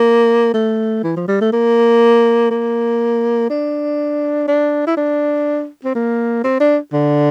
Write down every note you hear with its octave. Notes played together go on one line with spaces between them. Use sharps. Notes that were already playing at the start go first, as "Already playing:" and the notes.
Already playing: A#3
A3
E3
F3
G3
A3
A#3
A#3
D4
D4
E4
D4
C4
A#3
C4
D4
D3